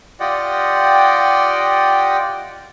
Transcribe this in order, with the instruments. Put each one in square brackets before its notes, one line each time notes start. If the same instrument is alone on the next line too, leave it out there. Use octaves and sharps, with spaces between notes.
[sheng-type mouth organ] F4 G4 D5 D#5 F#5 G5